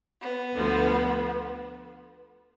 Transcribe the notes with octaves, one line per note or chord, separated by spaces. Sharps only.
B3
D2 D3 F3